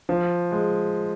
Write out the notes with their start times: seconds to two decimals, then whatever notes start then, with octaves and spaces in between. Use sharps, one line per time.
0.09 F3
0.52 G#3